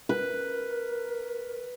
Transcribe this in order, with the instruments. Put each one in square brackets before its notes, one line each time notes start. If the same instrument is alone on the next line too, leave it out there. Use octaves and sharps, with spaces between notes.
[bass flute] A#4 [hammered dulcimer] B4